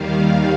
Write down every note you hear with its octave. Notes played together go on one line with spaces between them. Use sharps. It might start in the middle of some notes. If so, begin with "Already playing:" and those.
Already playing: D#2 D#3 G3 F5
F5